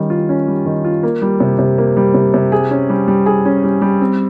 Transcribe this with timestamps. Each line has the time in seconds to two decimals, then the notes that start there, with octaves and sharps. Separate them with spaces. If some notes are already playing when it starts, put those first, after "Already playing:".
Already playing: D#3 G3 C#4
0.10 F4
0.29 C#4
0.48 G3
0.66 D#3
0.84 F4
1.03 A#3
1.22 G3
1.40 C3
1.59 C3
1.78 A#3
1.97 G3
2.14 C3
2.34 C3
2.52 G#4
2.71 C#4
2.89 G3
3.08 G3
3.26 G#4
3.45 C#4
3.64 G3
3.82 G3
4.01 C4